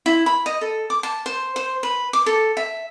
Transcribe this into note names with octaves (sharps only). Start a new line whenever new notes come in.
E4
B5
D#5
A4
D6
A5
C5
C5
B4
D6
A4
E5